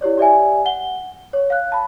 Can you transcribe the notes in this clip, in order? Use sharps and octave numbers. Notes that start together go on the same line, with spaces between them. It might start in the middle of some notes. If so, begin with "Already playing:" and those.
E4 G4 C#5 D5
G4 D5 E5 G#5
F#5 G7
C#5
F5 F#6
A5 B5